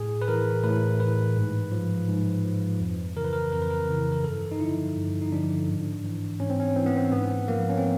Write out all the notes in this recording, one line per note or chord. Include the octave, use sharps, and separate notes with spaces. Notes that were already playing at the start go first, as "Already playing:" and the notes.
Already playing: A2 G#4
B4
E3 A#4
A2 B4
E3 B4
G#2
F3
G#2
F3
F2
C#3 E3 A#4
B4
A#4
F2 A#4
B4
A#4
C#3 E3
A#4
G2 A4
D#4
D3 F3 E4
G2
D#4
D3 F3 D4
G#2
E3
G#2 C#4
C4
C#4
E3 C4
B3
C4
G#2 B3
F3 A#3
C#4
C4